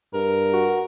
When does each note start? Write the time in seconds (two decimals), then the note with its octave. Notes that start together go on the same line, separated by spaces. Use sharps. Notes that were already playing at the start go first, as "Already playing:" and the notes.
0.14 G2 A#4
0.53 F#4